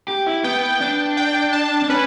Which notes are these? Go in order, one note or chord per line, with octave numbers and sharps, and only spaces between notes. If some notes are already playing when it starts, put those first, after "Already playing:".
G4
E4
B3 G5
D4
G5
A5
D4
C#4 B4